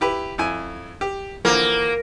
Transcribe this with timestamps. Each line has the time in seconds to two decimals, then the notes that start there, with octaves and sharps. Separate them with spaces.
0.01 E4 G4 B4
0.38 F2 E4 G#5
1.01 G4
1.45 D3 E3 F3 A#3